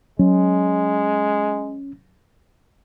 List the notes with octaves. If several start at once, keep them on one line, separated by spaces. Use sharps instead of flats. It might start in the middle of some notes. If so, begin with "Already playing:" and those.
F#3 G#3 C#4